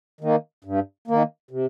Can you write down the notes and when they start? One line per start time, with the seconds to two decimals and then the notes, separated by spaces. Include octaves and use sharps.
0.21 D#3 A#3
0.64 G2
1.08 D#3 A#3
1.51 C3